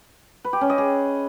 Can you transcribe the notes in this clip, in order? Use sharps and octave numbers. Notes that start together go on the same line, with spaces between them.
B4
G4
C#4
D#5
G#4